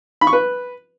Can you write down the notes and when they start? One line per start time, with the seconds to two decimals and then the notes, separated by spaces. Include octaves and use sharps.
0.21 B5
0.27 C#6
0.33 B4